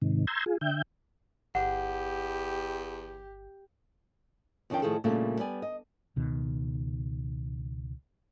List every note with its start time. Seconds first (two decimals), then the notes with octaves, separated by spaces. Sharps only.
0.02 G#2 C3 D#3
0.27 A#5 C6 E6 G6 G#6
0.46 F4 G#4
0.61 D3 E5 G5 G6
1.55 G1 E2 G4 F#5
4.70 F2 D#3 C#4 D4 F4 G5
4.82 A2 D#3 F3 G#4 A4
5.04 A#2 C#3 G3 A3 A#3 D4
5.39 G3 B3 D5 G#5
5.62 D#5
6.16 C#2 B2 D#3